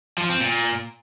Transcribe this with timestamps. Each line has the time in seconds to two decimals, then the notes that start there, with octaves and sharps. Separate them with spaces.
0.18 F3
0.29 C4
0.41 A#2